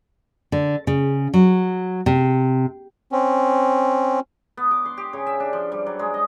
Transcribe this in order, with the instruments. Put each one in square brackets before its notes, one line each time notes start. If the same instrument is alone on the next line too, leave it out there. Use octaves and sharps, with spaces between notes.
[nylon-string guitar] D3
C#3
F#3
C3
[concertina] C4 C#4
[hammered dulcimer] B3
D6
C6
G4
C#3
E5
D4
F3
G3
F#3
G#3
D#5